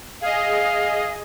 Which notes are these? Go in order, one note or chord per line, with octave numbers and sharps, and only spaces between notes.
G#4 D#5 F5